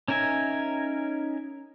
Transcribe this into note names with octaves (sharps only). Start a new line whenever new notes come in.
C#4 D#4 A#4 E5 G#5